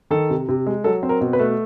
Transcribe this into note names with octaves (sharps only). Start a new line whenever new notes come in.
D#3 A4
C3
C3
G#3
F#3 A4
C4
A#4
B2
B4
A3